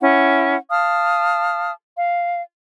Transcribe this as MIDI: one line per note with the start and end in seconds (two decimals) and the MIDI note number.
0.01 0.57 61
0.01 0.57 64
0.01 0.57 78
0.71 1.71 77
0.71 1.71 81
0.71 1.71 87
0.71 1.71 89
1.97 2.41 77